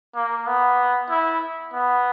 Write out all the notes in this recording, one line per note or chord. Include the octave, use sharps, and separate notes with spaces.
A#3
B3
E4
B3